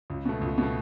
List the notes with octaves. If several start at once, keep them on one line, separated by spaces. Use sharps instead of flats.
C#2
B2 A3
C#2
B2
A3